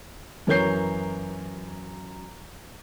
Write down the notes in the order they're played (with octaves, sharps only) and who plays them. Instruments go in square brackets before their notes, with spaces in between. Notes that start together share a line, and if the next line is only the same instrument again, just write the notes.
[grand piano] F#2 E3 A#4 C#5 G6 C7